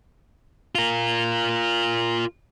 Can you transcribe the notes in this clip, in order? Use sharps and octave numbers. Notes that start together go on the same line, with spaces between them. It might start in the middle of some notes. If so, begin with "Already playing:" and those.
F4 A#4